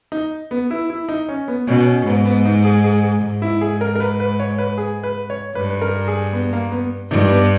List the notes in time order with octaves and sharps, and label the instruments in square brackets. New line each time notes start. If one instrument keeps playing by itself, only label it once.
[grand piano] D#4
B3
E4
E4
D#4
C#4
B3
[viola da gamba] B2 [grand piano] C#4
[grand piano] C#4
[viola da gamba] G#2 [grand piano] B3
[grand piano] B3
D#4
G#4
G#4
G#4
[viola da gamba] G#2
[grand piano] E4
G#4
A#4
A#4
B4
B4
C#5
B4
G#4
B4
C#5
[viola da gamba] G2 [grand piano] B4
[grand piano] B4
A#4
G#4
B3
A#3
B3
[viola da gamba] G2 [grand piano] D#4
[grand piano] B3